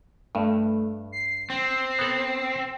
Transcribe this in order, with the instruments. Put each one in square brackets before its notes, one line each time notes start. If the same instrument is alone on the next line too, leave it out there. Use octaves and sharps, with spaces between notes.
[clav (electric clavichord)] G2 [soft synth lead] A3
[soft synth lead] C7
[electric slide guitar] C4
[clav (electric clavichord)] B3 A4